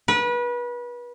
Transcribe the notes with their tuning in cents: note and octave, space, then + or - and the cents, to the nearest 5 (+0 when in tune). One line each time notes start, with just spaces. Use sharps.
B4 -30